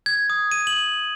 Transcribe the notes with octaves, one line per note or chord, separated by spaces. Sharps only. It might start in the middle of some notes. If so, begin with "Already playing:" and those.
G#6
D#6
D#7
F#7